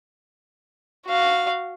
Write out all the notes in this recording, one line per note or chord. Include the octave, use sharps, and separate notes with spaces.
F#4 F5